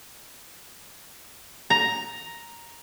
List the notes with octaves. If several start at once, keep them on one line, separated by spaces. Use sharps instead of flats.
A#5